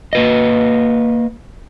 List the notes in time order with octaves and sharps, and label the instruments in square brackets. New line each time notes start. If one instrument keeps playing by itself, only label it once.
[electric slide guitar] A#3 B4 D#5